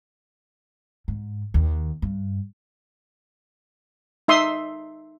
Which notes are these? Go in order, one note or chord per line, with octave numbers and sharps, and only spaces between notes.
G#2
D#2
G2
D#4 E5 C6 D#6